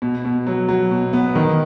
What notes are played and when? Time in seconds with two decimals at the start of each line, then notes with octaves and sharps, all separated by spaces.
0.02 B2
0.25 B2
0.47 F#3
0.69 F#3
0.91 B2
1.13 B3
1.35 D#3